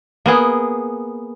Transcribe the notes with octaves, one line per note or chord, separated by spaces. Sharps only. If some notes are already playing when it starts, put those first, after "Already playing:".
A#3 B3 G#4